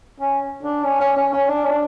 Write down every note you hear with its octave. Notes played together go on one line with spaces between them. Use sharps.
C#4
D4
C#4
C#4
C#4
C#4
D4
C#4
D4